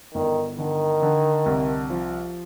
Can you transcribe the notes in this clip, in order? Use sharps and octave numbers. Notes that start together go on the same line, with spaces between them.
G1 D#3
D3 D#3
D3
C2
F3